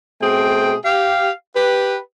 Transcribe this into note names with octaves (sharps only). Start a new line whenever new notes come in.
B2 A3 C4 G#4 G5
G4 F5
G4 B4